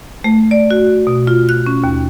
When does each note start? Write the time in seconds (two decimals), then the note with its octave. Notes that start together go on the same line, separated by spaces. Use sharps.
0.24 A3
0.51 D5
0.71 F#4
1.07 B2
1.27 F4
1.49 F#6
1.66 C#4
1.84 D#2